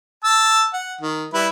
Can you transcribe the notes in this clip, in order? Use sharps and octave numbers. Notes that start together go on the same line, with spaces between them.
A5 E6
F#5
D#3
G3 E4 B4